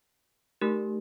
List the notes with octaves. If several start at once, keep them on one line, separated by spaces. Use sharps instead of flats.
A3 D#4 G4 A#4